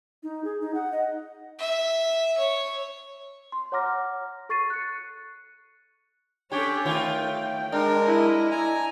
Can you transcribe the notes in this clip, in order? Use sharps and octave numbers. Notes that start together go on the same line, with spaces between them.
D#4
G#4
D#4
F#5
D#5
E5
C#5
C6
C#5 F#5 A#5 D6 F6 A#6
A4 C#6 A6 C7 D#7
F#6 C#7
C#4 D4 G4 A4 C#5
D#3 A3 F4 C#5 G5
G#3 D4 A#4
E4 D#5
G#5 A#5